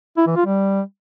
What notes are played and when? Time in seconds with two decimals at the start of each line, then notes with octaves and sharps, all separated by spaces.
0.17 E4
0.27 E3
0.36 F4
0.45 G3